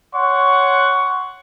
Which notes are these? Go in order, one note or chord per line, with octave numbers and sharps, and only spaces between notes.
C#5 F#5 C6 C#6